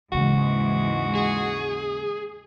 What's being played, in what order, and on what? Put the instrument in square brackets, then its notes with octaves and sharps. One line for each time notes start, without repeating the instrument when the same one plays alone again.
[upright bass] D#2 C#3 [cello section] G#2 E3 G#3 [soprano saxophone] F#4
[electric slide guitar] G#4